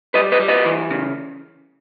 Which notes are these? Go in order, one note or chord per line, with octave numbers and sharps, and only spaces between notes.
G3 B4 D#5
B4 D#5
G3
B4 D#5
E3
C#3